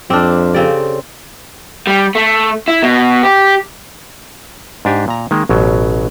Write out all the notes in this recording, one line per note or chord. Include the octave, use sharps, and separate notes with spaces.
F2 C4 D4 D6 F6
C#3 C4 G4 A4 D5
G3
A3
E4
B2
G4
G#2 D4 G4 G#5
A#2 A#5
D#3 G#3 A#3
A1 B2 F#3